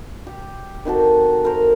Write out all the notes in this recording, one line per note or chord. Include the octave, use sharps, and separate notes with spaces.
G4
D#3 C4 F#4 A4
A#4 C5